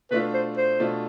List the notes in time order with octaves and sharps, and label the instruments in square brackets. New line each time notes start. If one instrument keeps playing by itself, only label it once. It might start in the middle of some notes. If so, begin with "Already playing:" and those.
[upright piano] B2 A3 D4 F4 [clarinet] B4
[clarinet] C5
C5
[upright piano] B2 A3 D4 F4